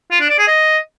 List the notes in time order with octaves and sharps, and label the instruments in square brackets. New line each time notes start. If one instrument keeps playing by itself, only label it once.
[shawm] F4
D4
D5
G#4
D#5